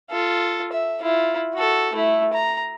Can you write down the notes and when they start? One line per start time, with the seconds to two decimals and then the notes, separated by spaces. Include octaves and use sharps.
0.10 F4 A4
0.72 E5
1.02 E4 F4
1.54 F#4 A4
1.93 A3 E4
2.33 A#5